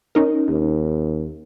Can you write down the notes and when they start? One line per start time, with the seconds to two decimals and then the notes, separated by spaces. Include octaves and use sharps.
0.15 C#4 D#4 A#4
0.49 D#2